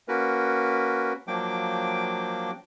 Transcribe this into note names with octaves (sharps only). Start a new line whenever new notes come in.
A#3 C#4 F#4 A#4 B4
F3 F#3 A#3 D4 G5 D6